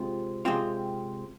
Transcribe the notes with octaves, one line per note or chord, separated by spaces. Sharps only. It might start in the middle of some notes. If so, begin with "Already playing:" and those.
Already playing: C3 G#3 C4 F4
C3 G#3 C4 F4